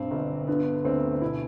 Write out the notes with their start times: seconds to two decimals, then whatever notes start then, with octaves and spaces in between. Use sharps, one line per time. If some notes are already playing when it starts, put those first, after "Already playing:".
Already playing: B1 G2 C4
0.11 G1
0.47 D3 B3
0.84 D2 C4
1.22 B2 E4